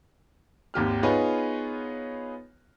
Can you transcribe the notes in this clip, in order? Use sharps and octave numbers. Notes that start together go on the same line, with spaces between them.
G#1 D#2 G4 F6
B3 D#4 F4 G#4 B4 C#5